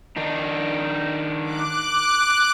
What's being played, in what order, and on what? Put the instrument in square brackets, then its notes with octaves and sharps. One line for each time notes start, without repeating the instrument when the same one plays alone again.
[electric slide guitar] D#3 D4 D#4
[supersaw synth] D6 F#6